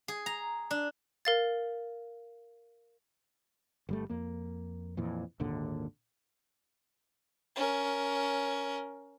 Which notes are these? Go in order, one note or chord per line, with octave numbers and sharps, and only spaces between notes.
G#4
A#5
D4
A#4 F5 A6
G1 G3 A3
F2 A#3
F2 A#2 E3
G#1 D#2 A#2 D3
C#4 A#4